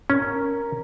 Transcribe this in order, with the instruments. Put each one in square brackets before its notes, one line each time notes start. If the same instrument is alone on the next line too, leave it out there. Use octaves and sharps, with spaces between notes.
[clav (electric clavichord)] C#4 [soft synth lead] A#4